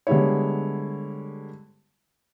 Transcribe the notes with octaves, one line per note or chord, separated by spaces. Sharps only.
D3 G3 G#3 B3 E4 C#5